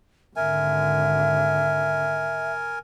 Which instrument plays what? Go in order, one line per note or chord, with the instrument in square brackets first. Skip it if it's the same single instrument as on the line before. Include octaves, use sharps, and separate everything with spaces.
[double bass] G#1 D3 [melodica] A#4 G#5 [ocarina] E5